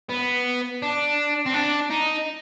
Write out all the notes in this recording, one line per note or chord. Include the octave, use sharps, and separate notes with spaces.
B3
D4
C4
D4
D#4